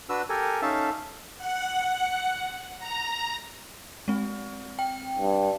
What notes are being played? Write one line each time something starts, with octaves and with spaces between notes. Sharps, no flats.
D4 F#4 B4 E6
G4 A4 A#4 G#5
C#4 D#4 A4 E5 F5 A5
F#5
A#5
G#3 C4
G5
G2